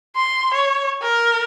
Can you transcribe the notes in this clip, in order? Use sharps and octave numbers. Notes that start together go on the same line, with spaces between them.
C6
C#5
A#4